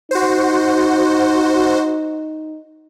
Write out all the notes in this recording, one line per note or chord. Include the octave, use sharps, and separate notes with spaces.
D#4 F#4 C5